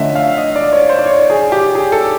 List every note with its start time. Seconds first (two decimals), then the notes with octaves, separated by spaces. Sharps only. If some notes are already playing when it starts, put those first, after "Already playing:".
Already playing: D3 F3 A3 C#4 D#5 E5
0.15 F5
0.37 D#5
0.56 D5
0.73 C#5
0.89 C5
0.98 D5
1.06 C#5
1.30 G#4
1.52 G4
1.75 G#4
1.92 A4